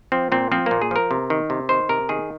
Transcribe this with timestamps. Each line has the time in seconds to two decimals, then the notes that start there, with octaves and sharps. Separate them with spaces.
0.12 F3 C4
0.32 A#2 C4
0.52 F3 C4
0.66 A#2 A#3
0.82 G#4
0.91 F3 A#4
1.11 C3
1.30 D#3
1.50 C3
1.69 D#3 C5
1.89 C3 A#4
2.09 D#3 G#4